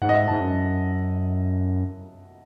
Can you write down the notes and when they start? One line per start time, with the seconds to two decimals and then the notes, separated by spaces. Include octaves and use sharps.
0.02 G#2 F#5
0.09 D#5
0.14 E5
0.28 G#2 A5
0.41 F#2